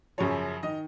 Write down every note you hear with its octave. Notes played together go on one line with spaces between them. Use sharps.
F#2 C#3 F3 C#5
D#3 D#5